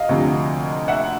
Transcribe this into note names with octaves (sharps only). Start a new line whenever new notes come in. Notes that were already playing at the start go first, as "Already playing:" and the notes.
Already playing: D#5 F5
D2 C3 F3
E5 F#5